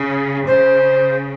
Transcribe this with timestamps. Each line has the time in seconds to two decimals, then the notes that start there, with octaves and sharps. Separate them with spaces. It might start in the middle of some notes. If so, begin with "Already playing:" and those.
Already playing: C#3
0.47 C#3 C5